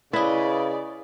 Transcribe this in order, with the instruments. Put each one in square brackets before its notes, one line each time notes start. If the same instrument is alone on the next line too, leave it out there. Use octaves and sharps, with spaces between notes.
[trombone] C#3 [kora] E4 [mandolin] B4 D#5 [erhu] D5